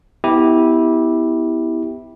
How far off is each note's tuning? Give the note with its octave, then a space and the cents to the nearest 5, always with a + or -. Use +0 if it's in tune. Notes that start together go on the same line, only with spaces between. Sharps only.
B3 +20 E4 -15 G4 +0